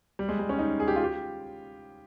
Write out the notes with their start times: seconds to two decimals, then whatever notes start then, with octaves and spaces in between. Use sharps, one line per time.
0.19 G3
0.29 G#3
0.39 G3
0.49 C#4
0.59 D#4
0.80 G#4
0.88 G4
0.96 F4
1.04 G4